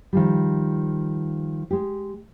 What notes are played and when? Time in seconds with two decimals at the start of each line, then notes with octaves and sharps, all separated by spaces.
0.13 D#3 F3 G3
1.71 G#3 G4